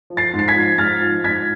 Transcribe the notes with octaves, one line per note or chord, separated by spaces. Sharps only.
F3
A6 C7
G#2
C7
G#6 B6
F3
G#2 F6 A6
F3
G#2 G#6 B6